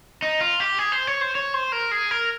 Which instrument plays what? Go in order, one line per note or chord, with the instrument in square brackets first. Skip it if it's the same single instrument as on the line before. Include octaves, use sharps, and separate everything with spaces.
[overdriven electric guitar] D#4
F4
G4
G#4
C5
C#5
C5
C#5
C5
A#4
G#4
A#4